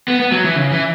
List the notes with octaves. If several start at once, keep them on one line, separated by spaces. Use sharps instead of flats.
B3
B3
F#3
E3
C#3
E3